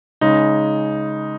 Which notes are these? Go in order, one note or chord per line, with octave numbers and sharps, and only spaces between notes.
C#3 G#3 D#4